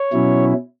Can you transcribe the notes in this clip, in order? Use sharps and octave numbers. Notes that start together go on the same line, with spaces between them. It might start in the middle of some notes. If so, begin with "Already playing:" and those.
Already playing: C#5
B2 F#3 C#4 E4